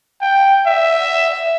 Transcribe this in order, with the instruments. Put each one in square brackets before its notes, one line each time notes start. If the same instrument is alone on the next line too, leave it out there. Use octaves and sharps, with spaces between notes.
[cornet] G5
E5